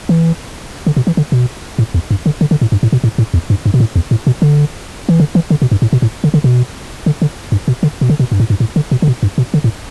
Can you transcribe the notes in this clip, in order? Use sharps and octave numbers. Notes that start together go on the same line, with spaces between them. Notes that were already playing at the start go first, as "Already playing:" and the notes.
E3
D3
B2
E3
D3
B2
A2
E2
G2
D3
D3
D3
A2
G2
A2
B2
A2
A2
E2
G2
G2
B2
A2
E2
A2
B2
D3
E3
D3
E3
D3
B2
G2
A2
B2
A2
D3
D3
B2
D3
D3
G2
B2
D3
B2
D3
B2
G2
A2
G2
A2
D3
B2
D3
B2
G2
B2
D3
A2